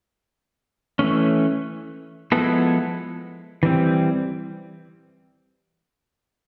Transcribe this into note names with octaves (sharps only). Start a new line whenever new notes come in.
E3 A3 C#4
F3 G#3 B3 E4 A4
E3 G3 C4